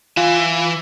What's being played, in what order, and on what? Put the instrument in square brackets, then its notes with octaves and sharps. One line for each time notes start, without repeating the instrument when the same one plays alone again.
[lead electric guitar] E3 G#5 [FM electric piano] F4